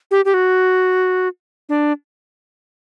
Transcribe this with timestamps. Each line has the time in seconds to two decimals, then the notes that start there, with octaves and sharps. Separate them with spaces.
0.11 G4
0.25 G4
0.34 F#4
1.69 D4